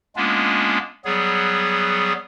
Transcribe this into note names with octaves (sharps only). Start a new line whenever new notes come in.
G#3 A#3 B3 C#4 D4 F4
F#3 G3 B3 G#4 C#5